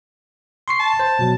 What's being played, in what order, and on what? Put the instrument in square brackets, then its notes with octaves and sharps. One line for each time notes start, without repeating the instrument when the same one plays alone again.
[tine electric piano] C6 C#6 C7
[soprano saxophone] A5
[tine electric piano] C5
B2 F#3